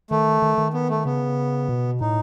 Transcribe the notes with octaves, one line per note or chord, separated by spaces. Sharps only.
D#3 A3
D#3
D#3
B3
A3
C#3 B3
B2
A2 D#4